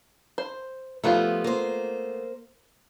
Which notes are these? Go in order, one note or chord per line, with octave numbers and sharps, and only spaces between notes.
C5
F3 G3 A3 B3 F4
A#3 C5